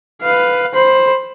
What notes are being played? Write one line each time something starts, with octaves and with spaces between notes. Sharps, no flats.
B4 F5
C5 B5